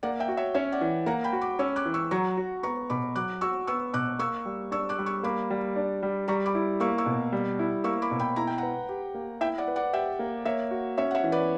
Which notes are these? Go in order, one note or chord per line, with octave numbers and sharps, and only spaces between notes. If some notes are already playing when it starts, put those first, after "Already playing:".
A#3 D5 F#5
E5 G5
F#4
C#5 E5
C#4 C#5 E5
D5 F#5
E3
A#3 F#5 A#5
G5 B5
F#4
B5 D6
C#4 C#6 E6
D6 F#6
E3
C#6 E6
F#3 A#5 C#6
F#4
B3 A#5 C#6
B2 B5 D6
F#3 D6 F#6
F#4 C#6 E6
B3 C#6 E6
B2 D6 F#6
A#3 C#6 E6
G3
D4 C#6 E6
D6 F#6
G3
C#6 E6
A#3 B5 D6
G3
D4
G3
G3 A#5 C#6
B5 D6
E4
A#3 C#6 E6
C#6 E6
B2
G3
E4
A#3 C#6 E6
B5 D6
B2
G5 B5
E4 A#5
G5
B4 F#5 A#5
G4
A#3
E4 E5 G5
D5 F#5
B4
D5 F#5
G4 E5 G5
A#3
A#3 C#5 E5
F#4
C#4 C#5 E5
F#5
C#5 E5
E3
B4 D5